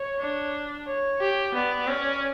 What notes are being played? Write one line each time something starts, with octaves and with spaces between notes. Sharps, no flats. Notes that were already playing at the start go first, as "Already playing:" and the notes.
Already playing: C#5
D4
C#5
G4
B3 D5
C#4